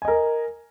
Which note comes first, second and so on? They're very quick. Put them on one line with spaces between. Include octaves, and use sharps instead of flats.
G#5 D#5 A#4